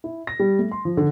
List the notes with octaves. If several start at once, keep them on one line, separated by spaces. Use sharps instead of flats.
E4
A#6
G3
A3
C6
F3
D3